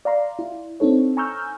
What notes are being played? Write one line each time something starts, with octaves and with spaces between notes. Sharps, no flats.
D5 F5 A#5 C6
E4
C4 D4 D#4 A4 C#5
G#5 A#5 C#6 E6 F6 G6